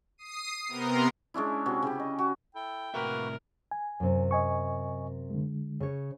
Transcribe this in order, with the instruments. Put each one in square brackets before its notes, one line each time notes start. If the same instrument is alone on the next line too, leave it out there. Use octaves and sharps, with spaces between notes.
[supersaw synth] D#6 C7 D#7
C3 B3 A#4 A#5 C6
[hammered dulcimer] G#3 C#4 D4 E4
C3 C#4 F#4
C#3 G4
D#5
F#4
[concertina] E4 A4 [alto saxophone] G5
[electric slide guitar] A2 C3 E5 [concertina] A#3 F#4 B4 [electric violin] A#4
[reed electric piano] G#5
[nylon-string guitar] F#2 C3
[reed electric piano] D#5 G#5 C#6
D3 G#3
[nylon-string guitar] C#3 C#5